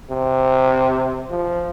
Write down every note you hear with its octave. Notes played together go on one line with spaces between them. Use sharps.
C3
F3